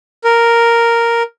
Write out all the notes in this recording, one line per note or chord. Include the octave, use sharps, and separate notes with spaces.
A#4